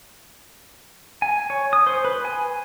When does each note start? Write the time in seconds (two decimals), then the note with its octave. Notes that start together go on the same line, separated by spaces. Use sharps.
1.22 G#5
1.50 C#5
1.73 D#6
1.87 C5
2.05 B4
2.25 G#5